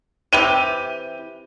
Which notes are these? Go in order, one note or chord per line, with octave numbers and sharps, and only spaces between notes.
C3 E3 G4 D#7 F7 G7